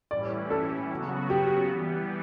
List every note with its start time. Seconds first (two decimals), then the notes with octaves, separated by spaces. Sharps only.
0.11 A2 E3 G3 C#4 E4 D5
0.50 A4
0.90 C#3 F#3 B3 F#4
1.30 G4
1.70 E3 G3 B3